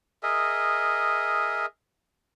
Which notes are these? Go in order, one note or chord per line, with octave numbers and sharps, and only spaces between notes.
G#4 A#4 D#5 E5